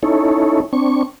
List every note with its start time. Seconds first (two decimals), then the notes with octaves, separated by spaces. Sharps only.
0.03 C#4 D#4 E4 A4 C#5
0.73 C4 D4 C#6